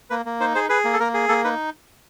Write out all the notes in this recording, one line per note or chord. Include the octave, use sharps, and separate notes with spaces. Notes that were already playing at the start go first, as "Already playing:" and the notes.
A#3 B4
A#3
D#4 C5
G#4 C5
G#4 B4
A#3
A4
A#3 A#4
G#4
A#3 A4
D#4 B4